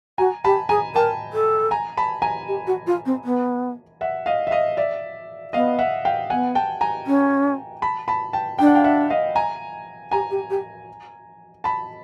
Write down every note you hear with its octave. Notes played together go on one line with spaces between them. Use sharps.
F#4 G#5 A#5
G4 A5 B5
G#4 G#5 A#5
A#4 G5 A5
A4
G#5 A#5
A5 B5
G#5 A#5
G4
F#4
F4
C4
B3
E5 F#5
D#5 F5
E5
D#5 F5
D5 E5
B3 D#5 F5
E5 F#5
F5 G5
B3 F#5 G#5
G5 A5
G#5 A#5
C#4
A5 B5
A5 B5
G5 A5
D4 G5
F#5
F5 G5
E5 F#5
D#5 F5
G#5 A#5
G4 G#5 A#5
G4
G4
A5 B5